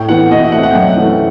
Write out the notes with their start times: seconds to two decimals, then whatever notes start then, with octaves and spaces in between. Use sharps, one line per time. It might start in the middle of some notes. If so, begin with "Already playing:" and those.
Already playing: A2 G5
0.09 E3 B3 F#5
0.31 B2 D#5
0.41 E5
0.52 A3 C4 F#5
0.63 F#5
0.71 G5
0.74 F#2 F#5
0.96 E3 A3 C4